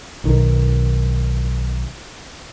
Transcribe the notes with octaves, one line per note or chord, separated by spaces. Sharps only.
B1 D#3